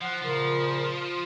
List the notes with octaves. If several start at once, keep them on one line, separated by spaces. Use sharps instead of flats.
F3 F#5
A#2 C#3 F3 A#4